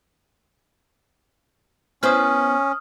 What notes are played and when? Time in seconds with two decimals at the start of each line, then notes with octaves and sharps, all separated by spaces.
2.03 B3 C#4 E4 C5 D#6 F6